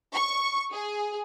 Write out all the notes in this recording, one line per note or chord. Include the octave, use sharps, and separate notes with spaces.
C#6
G#4